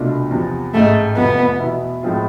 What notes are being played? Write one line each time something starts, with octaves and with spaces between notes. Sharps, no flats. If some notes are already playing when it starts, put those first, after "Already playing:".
Already playing: C2 B2 A3 D4 F4
E2 C3 F3
A1 G#2 G#3 A3
F1 E2 C3 F3 A3 B3
E2 B2 B3 E4
A2 F3 G#3 C4 F4